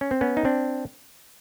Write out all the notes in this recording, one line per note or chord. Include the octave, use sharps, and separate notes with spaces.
C#4
C4
B3 C#4
D#4
C4 D4